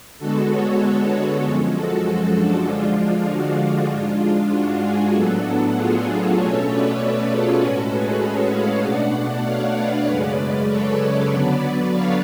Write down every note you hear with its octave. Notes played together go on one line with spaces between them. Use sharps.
D3 G#3 B3 F#4 A4
A4 C#5
F#2 F3 G#3
F#4 A4
D4 F#4
D3 F3 G#3 D4 F4
D4
D4 F#4
G#2 G#3 D4 F4
F4
D4 F#4
F4 G#4
A2 F#3 B3 D4 F#4 A4
F4 G#4
B2 A3 C#4 A4 C#5
B4 D5
B4 D5
F4 G#4
A2 G#3 C#4 F#4 A4
G#4 B4
A4 C#5
C#5 F5
B2 A3 D4 D5 F#5
C#5 F5
B4 D5
F#2 C#3 G#3 C#4
A4 C#5
D3 F#3 B3 D4 B4 D5
B4 D5
C#5 F5